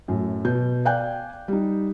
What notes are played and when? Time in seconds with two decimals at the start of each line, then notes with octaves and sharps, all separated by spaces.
0.08 F#2 A2
0.45 B2 G6
0.85 D5 F5 G5 G#5 F#6 G6
1.48 G3 D#4